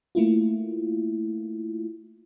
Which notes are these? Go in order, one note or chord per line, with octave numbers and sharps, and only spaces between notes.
A3 A#3 E4 F4